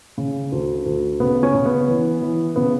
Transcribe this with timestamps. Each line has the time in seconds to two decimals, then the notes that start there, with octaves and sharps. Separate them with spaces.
0.18 C#3
0.52 D2
0.86 D2
1.20 C#3 B3
1.43 C#4
1.54 C#3
1.66 B3
1.88 E3
2.22 E3
2.56 C#3 B3